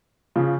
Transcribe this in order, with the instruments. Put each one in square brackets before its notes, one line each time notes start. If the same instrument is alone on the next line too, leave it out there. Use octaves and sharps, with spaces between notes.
[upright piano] C#3 F3